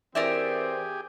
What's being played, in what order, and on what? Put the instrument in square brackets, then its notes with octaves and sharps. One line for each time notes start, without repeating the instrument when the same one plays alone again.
[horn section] E3 C4 [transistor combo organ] G4 G#4 [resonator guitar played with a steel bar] A#4 D5 E5